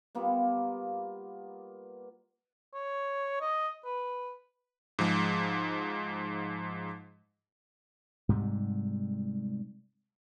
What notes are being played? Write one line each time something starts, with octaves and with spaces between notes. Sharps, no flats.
G3 A#3 B3 F4
C#5
D#5
B4
G#2 F3 G#3
G#2 C3 G3